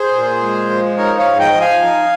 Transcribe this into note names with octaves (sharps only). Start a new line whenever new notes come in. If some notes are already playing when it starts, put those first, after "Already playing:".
Already playing: G#4 C5
A#2
G#3
F3
D#4 A#4 C#5
C#5 F5
G#2
D#5 G5
F3
F5 G#5
D#4